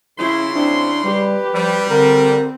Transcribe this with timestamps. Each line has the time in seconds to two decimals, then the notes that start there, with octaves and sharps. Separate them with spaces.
0.18 C#3 C#4 E4 C6
0.55 C4 D4 E4
1.04 G3 G4 B4
1.54 F3 G3
1.90 D3 C4 A#4